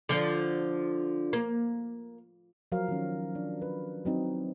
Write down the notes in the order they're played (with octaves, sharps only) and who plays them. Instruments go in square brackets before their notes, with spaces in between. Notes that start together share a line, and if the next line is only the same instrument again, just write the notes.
[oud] D3 F3
A#3
[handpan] F3 F#3 A#4 F5
D#3 C#4
D4
B4
F#3 C4 D#4